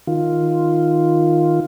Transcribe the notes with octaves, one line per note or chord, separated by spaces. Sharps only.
D#3 F4